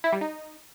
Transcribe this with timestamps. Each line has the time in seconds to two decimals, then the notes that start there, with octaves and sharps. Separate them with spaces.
0.04 E4
0.13 G3
0.21 D#4